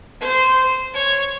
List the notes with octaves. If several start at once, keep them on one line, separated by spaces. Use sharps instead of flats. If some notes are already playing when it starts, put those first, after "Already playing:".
C5
C#5